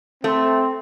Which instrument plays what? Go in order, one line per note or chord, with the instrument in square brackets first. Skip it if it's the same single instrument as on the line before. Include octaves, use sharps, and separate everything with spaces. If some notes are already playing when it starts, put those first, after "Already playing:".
[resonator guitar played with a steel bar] A3 [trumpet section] C4